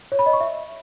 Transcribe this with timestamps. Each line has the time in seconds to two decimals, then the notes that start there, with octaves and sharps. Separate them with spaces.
0.12 C#5
0.19 B5
0.26 D#5
0.33 C#6
0.40 E5